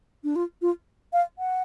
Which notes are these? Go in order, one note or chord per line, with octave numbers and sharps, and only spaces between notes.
D4
F4
F4
F5
F#5